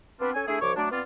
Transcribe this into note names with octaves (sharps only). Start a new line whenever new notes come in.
B3 C4 D4 F4 B4
C#4 A4 G#5
A3 D4 E4 G#4
C2 F3 C#5 C#6 D6
F#3 A3 D4
B3 C4 F4 D5